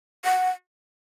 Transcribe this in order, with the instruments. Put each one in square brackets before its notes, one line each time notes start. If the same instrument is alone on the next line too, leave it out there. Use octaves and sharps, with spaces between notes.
[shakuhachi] F#5